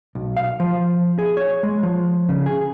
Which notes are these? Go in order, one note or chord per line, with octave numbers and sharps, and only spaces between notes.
B1
F5
F3
G#4
C#5
G#3
F3
C#3
G#4